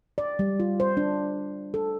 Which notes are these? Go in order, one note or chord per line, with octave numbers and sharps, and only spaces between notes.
D5
G3
F4
C5
D4
A4